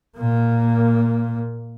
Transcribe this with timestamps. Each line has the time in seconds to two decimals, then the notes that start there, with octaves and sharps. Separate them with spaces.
0.18 A#2 A#3